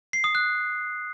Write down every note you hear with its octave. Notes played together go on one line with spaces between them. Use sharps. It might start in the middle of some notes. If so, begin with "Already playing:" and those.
C7
D#6
F#6